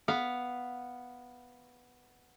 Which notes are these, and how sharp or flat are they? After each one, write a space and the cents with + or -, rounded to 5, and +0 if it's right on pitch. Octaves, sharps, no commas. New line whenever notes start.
B3 +0 F5 +0